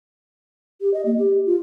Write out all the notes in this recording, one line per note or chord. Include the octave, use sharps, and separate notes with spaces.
G4
D#5
A#3
G4
F4